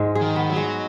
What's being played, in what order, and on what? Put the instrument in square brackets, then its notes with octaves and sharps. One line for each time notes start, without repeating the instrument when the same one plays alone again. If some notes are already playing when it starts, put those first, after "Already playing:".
Already playing: [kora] G#2 G#3
G#4
[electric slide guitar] D#3
[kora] B3
[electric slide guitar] F#3
[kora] G#3